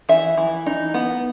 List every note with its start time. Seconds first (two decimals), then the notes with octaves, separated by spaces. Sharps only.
0.09 E3 E5
0.37 E3
0.66 D#4
0.94 B3